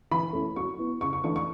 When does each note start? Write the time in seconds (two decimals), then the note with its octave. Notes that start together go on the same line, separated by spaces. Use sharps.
0.11 E3 B5
0.33 A3 C#4 E4
0.56 F#3 C#6
0.78 B3 E4
1.01 C#3 C#6
1.13 C#6
1.24 E3 A3 D4 C#6
1.36 C#6